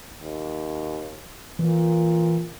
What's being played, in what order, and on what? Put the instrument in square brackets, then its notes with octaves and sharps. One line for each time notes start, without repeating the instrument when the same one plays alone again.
[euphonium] D#2
[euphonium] A#2 [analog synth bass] E3